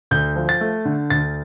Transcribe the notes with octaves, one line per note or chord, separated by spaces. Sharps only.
D2 G6
F3
A6
A3
D3
D2 A6